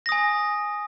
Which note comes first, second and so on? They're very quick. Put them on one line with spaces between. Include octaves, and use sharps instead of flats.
A#6 D#6 G#5